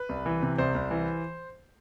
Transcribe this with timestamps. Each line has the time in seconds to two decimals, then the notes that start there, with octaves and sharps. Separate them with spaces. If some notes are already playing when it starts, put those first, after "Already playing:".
Already playing: B4
0.09 C2
0.26 E3
0.42 C3
0.58 C2 C5
0.75 C2
0.91 E3